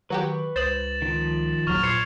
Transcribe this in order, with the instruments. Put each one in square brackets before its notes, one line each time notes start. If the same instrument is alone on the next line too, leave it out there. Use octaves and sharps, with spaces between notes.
[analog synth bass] D#3 [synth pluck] F#3 F#4 G4 [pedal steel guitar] B4 C#6
[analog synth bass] C#2 [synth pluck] C5 D#6 [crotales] A6 E7 F#7
[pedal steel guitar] D#3 F3
[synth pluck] A#1 F#3 [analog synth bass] D#2 [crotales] C#6 F6 F7
[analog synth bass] A#2 [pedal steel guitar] C5 D6 [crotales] G#6 C7 C#7